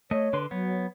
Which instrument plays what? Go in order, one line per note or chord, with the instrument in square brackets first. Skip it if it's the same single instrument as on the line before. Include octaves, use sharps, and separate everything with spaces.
[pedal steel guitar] A3 D#5 [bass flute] C#5
[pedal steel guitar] D3 B4 C6
[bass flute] F#3 [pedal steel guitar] B3 C#5